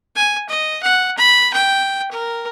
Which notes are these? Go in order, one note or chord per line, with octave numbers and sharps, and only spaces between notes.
G#5
D#5
F#5
B5
G5
A#4